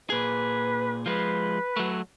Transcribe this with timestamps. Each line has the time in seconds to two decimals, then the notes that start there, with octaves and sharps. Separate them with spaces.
0.10 A#2 G#4 B4
1.06 F3 G#3 B4
1.77 F#3 A3